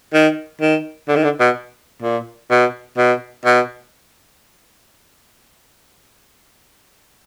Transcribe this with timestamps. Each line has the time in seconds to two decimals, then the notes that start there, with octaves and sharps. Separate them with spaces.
0.14 D#3
0.61 D#3
1.08 D3
1.16 D#3
1.24 D3
1.40 B2
2.02 A#2
2.51 B2
2.98 B2
3.45 B2